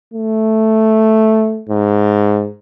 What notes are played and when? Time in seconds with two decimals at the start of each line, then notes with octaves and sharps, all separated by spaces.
0.14 A3
1.69 G#2